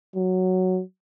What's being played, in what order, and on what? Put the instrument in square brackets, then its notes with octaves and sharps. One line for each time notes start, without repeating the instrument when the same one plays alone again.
[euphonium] F#3